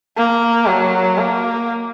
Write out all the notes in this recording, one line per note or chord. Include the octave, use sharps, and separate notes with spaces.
A#3
F#3
A#3